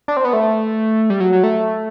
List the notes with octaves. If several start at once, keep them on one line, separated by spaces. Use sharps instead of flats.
D4
C4
B3
A3
G3
F#3
F#3
A3